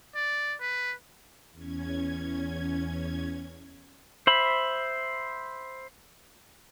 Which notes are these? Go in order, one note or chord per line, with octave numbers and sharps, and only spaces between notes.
D5
B4
E2 C#4 G#6
C5 E5 B5